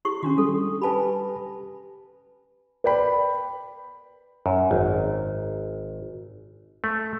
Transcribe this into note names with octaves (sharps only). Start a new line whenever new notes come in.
E4 G4 C#6
D#3 C#4 D4 F#4
G3 A4
G4 B4 G#5 A5 B5
B4 D5 G5 B5
F#2
G#1
A3